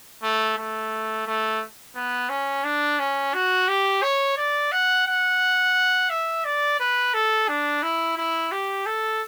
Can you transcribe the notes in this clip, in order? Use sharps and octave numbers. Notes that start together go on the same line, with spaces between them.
A3
A3
A3
B3
C#4
D4
C#4
F#4
G4
C#5
D5
F#5
F#5
E5
D5
B4
A4
D4
E4
E4
G4
A4